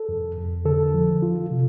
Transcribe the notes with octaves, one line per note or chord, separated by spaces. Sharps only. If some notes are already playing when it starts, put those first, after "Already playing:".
Already playing: A4
F2
F2
D3 A4
F3
F4
C3